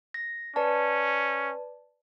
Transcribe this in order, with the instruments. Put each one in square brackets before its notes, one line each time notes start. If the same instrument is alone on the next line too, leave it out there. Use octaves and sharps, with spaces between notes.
[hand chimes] A#6
[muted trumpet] C#4 [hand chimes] B4 D5 A5